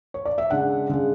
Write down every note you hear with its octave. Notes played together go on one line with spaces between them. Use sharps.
C#5
D5
E5
C#3 G#3 D4 F#5
C#3 G#3 D4